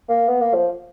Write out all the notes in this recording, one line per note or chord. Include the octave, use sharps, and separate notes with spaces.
A#3
B3
A#3
F3